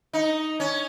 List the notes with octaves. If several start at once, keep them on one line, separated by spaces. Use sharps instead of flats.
D#4
C#4